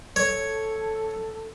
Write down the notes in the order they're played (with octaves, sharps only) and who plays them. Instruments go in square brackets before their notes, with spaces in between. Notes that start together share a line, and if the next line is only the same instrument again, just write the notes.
[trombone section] A4 [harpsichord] C#5